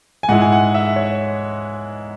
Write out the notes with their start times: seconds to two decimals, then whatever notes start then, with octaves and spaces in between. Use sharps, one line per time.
0.23 G#5
0.29 G#2 G#3 E4 F#5
0.42 G#5
0.52 F#5
0.74 E5
0.96 C#5